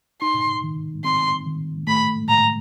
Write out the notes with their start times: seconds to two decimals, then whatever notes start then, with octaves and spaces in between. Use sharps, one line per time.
0.22 D#4 C6
0.63 D#3
1.05 C4 C6
1.46 D#3
1.87 A3 B5
2.29 A2 A#5